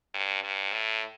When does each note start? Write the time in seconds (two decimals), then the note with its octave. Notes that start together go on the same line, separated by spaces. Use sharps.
0.14 G2
0.44 G2
0.72 A2